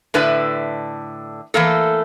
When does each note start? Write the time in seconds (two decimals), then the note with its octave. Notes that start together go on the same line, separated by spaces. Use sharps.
0.14 A2 D3 B4 D5 E5
1.54 E3 A3 A#3 A4